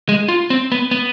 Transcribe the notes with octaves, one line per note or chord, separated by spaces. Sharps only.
G#3
F4
C4
B3
B3